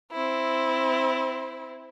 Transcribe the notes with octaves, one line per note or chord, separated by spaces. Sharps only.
C4 E4